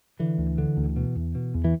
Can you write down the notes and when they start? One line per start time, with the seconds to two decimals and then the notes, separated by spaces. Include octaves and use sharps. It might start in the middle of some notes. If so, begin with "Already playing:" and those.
0.19 D3 E3
0.38 D2
0.58 D3
0.77 D2
0.96 B2
1.16 E2
1.35 B2
1.54 E2
1.64 E3